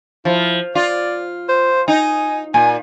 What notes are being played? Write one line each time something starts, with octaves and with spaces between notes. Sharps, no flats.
F3 E4
F4 D5
C5
D#4 G#5
A#2 G#5